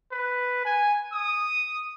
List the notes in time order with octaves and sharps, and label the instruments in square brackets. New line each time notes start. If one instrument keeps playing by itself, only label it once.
[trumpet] B4
G#5
D#6